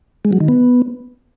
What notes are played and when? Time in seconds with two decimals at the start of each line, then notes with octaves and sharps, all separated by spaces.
0.25 G#3
0.33 F#3
0.40 D#3
0.48 B3